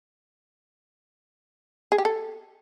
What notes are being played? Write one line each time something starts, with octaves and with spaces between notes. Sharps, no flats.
G#4
G4
A4